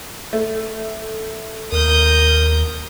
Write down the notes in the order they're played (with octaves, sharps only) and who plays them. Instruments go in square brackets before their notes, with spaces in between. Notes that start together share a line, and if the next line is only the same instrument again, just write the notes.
[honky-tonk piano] A3
[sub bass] D#2 [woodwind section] A#4 [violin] D#6 G6